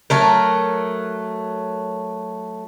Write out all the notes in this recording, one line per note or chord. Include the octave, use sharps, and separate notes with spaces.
F#3 A3 A#4